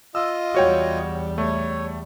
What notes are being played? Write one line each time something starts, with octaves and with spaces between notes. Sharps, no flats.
F4 D#5 E6
E2 G3 F#4 C#5 G5
A3 C#5